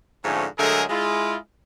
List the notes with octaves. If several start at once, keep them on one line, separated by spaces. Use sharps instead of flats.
G#2 D3 F3 A3 C#4
D3 F#3 G#3 A3 G#4 A#4
G#3 E4 F4